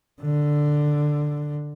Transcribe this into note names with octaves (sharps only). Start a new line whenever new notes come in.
D3